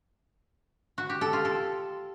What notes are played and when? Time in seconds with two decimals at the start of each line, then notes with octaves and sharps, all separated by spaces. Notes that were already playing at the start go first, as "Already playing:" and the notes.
0.98 F#4
1.10 G4
1.21 A4
1.33 F4
1.45 A4